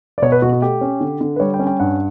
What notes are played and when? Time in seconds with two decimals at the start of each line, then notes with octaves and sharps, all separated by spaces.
0.18 D5
0.22 B2 C#5
0.32 B4
0.42 B2 F#4
0.53 F#4
0.61 A3 G4
0.81 C#4
1.01 D3
1.21 D3
1.36 B4
1.40 G3 C#5
1.54 G5
1.59 C#4
1.67 G5
1.80 G2 F#5